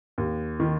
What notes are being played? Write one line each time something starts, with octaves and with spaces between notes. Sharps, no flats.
D#2
D#3